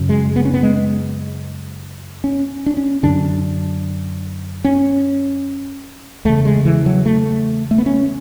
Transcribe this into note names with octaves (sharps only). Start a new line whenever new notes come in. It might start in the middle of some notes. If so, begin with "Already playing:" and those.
Already playing: F#2 C#3
G#3
B3
C#4
B3
G#3
C#4
D4
C#4
F#2 D3 D4
C#4
E2 C#3 A3
G#3
E3
F#3
A3
A3
B3
C#4